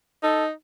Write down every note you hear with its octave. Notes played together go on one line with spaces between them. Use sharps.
D#4 A4